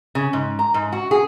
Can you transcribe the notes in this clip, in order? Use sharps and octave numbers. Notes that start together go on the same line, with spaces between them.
C#3
G#2
A#5
G#2
F#4
G#4